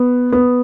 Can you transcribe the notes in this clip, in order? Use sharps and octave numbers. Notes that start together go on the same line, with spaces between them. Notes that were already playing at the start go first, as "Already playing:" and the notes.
Already playing: B3
B3